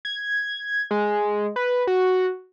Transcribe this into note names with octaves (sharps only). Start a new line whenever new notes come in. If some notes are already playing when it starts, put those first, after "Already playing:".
G#6
G#3
B4
F#4